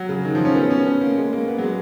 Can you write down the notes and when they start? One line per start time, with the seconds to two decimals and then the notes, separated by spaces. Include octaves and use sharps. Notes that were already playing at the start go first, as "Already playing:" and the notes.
Already playing: F#3
0.09 C#3
0.25 D#3
0.35 F3
0.45 C#4
0.56 B3
0.71 C#4
0.86 B3
1.01 A#3
1.17 G#3
1.33 A#3
1.48 B3
1.58 F#3
1.64 G#3